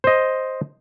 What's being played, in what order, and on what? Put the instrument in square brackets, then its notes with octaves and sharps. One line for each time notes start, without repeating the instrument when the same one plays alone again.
[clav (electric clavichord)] C5 D#5